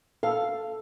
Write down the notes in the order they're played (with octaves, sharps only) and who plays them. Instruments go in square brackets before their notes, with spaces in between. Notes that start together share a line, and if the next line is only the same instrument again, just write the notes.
[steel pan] A4 [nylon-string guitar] F5